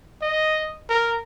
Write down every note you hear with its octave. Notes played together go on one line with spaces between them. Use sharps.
D#5
A#4